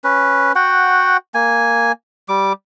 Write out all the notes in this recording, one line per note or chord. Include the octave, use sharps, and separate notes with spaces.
C#4 B4
F#4 F#5 G5
A#3 G#5
G3 D6